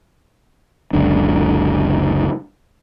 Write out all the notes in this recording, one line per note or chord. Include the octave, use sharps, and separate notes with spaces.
F#1 C#2 D3 D4